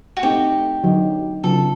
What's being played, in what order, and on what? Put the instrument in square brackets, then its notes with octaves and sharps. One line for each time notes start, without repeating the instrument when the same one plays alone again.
[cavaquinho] F#4
[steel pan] A3 C4 D#4 [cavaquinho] G4
[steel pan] D3 F#3 B3 D#4 F#4
[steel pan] C#3 F#3 B3 D4 F4 [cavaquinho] A4